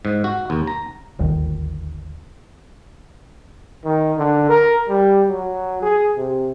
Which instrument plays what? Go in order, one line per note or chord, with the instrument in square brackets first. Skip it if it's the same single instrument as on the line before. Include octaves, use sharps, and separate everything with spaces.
[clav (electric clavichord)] G#2
F#4
D#2
A#5
[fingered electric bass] D#1 G#1 D2 D#3
[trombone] D#3
D3
A#4
G3
F#3
G#4
C3